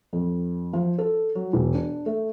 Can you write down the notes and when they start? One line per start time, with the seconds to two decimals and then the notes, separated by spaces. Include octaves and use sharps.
0.13 F2
0.73 F3
0.98 A4
1.35 F#3
1.53 E1
1.75 D4
2.06 A3